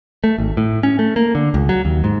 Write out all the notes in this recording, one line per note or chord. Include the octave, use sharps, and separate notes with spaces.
A3
G#1
A2
C#4
A3
A#3
D3
C#2
F#3
D#2
G#2